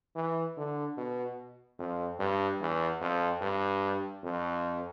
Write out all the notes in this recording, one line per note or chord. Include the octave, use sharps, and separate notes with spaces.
E3
D3
B2
F2
G2
E2
F2
G2
F2